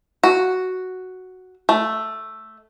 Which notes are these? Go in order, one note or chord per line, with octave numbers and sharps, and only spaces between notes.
F#4
A3